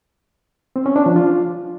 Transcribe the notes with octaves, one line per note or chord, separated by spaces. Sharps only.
C4
C#4
D4
F3
F4